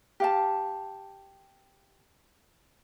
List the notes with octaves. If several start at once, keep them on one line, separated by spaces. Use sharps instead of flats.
G4 F5 A5